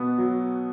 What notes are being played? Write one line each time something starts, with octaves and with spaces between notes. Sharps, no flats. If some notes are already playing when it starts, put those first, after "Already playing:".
Already playing: B2 B3
F#3